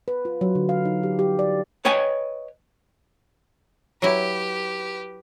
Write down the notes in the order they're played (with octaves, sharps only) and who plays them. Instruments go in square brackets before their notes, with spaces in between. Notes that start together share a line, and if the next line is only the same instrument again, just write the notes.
[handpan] B4
F4
F#3
D3
F5
D#4
G4
G4
D5
[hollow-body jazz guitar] B4 C#5 D#5 G5 G#5
[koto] F#3 E4 [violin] G4 B4